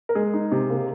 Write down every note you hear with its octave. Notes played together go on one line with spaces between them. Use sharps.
A#4
G#3 G#4
D#4
C3
A#3